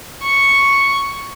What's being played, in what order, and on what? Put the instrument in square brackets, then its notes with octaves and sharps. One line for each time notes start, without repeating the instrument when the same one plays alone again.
[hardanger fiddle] C#6